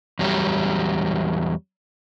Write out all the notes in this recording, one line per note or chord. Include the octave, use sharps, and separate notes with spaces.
E2 F#3 G3